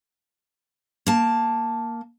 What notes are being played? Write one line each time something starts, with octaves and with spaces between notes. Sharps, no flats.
A#3 A5